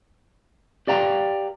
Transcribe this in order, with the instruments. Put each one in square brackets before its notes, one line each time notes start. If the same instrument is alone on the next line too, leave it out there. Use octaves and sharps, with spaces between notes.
[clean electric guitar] G4 B4 D5 F5 G5 A#5